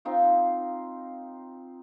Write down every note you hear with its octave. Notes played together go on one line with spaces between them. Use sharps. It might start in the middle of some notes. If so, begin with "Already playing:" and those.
C4 D#4 F4 F5